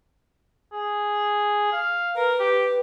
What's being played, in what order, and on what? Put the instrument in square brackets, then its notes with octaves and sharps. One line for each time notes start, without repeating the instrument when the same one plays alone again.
[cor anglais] G#4
F5
[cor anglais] A#4 [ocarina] B4
[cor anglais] G4